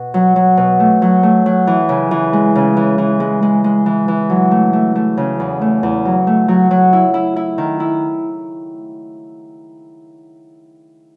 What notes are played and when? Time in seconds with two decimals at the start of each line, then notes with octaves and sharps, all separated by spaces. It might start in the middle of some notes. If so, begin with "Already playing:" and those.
Already playing: B2
0.14 F#3
0.36 F#3
0.57 B2
0.80 A3
1.02 F#3
1.23 A3
1.46 F#3
1.67 E3
1.89 C#3
2.11 E3
2.33 G#3
2.55 C#3
2.77 E3
2.98 E3
3.20 G#3
3.42 G#3
3.64 G#3
3.86 E3
4.08 E3
4.30 F#3
4.51 A3
4.73 A3
4.95 A3
5.17 C#3
5.40 E2
5.61 A3
5.83 E2
6.05 F#3
6.27 A3
6.48 F#3
6.71 F#3
6.93 E4
7.14 E4
7.36 E4
7.58 D#3
7.80 E4